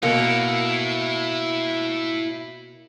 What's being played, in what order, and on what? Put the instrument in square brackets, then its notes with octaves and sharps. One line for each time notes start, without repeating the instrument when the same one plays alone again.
[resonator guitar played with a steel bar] B2 A#3 [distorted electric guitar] E4 C#5